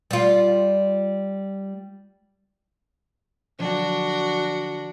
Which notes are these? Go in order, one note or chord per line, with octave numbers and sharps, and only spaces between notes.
G3 F4
D3 F3 F#3 D4 F#4